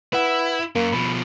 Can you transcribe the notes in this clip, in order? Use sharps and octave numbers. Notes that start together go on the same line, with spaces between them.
E4 B4 F#5
F#2 A#3
B2 F3 B5